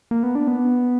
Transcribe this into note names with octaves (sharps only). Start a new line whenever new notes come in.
A#3
B3
D4
B3